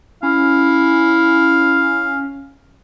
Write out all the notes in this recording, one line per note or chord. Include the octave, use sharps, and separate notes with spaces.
C#4 E4 F5